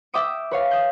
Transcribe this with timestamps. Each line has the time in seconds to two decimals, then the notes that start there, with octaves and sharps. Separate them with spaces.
0.14 E5 G5 D6 D#6 D7
0.51 B4 C#5 F5
0.71 D#6 G6